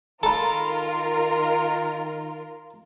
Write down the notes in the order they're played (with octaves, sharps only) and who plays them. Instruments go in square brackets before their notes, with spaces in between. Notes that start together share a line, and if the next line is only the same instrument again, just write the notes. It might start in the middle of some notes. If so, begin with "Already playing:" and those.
[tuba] D#3 [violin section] F4 A#4 [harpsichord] A4 [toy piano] A#5 B5